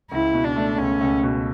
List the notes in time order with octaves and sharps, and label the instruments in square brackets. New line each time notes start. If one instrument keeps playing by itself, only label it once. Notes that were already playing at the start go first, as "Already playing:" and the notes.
[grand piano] C#2 [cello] E4
[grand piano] B2
[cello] D4
[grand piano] A3
[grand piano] C#2 [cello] C#4
[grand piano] C#2
B2